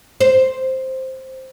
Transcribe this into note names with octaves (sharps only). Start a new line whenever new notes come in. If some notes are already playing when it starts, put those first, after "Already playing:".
C5